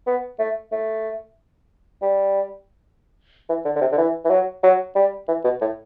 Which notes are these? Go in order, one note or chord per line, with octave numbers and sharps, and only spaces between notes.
B3
A3
A3
G3
E3
D3
D3
C3
D3
E3
E3
F#3
F#3
G3
E3
B2
A2